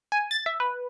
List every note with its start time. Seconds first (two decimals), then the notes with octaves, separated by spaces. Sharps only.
0.12 G#5
0.31 A6
0.46 E5
0.60 B4